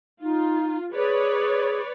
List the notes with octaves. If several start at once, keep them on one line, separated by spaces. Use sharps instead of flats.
D#4 F4
G#4 B4 C#5 D5